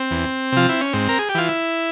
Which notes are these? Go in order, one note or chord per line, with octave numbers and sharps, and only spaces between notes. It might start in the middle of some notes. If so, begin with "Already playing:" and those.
Already playing: C4
E2
C3 F3 F4
E4
C#4
G#2 C4
A#4
G#4
G4
E3 F4
E4